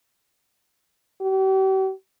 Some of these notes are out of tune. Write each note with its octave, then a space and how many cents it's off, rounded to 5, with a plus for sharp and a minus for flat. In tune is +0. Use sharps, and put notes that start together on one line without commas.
G4 -45